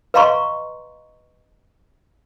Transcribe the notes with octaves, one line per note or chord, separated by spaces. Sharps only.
B4 D#5 F5 A#5 C6 C#6